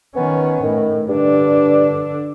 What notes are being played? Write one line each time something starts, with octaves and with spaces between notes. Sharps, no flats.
D#3 B3 C#4
A2 D#3
G2 D3 D4